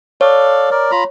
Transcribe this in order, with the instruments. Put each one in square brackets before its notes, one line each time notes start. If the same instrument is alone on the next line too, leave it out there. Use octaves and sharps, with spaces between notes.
[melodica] A4 D5 F5 [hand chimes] C#5
[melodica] A#4 D5
F4 A#5 B5